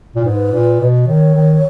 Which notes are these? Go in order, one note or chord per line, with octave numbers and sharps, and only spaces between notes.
A#2
G#2 B4
A#2
B2
D#3 C#5
D#3